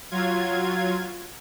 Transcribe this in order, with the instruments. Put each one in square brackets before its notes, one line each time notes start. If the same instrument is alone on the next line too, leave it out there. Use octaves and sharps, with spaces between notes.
[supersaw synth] F#3 F4 G#6